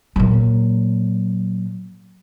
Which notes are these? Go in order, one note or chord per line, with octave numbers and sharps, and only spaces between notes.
A#2 F#3